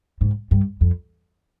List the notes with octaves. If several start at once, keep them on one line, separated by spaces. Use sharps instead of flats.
G#2
G2
F2